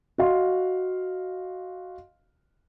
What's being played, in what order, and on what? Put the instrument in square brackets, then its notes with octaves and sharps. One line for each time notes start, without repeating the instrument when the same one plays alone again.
[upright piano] F#4 D#5 F5 C6